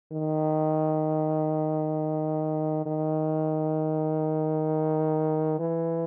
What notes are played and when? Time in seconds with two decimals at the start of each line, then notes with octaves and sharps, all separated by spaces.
0.12 D#3
2.86 D#3
5.59 E3